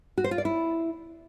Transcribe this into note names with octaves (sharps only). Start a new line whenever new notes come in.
F#4
C5
F4
D5
E4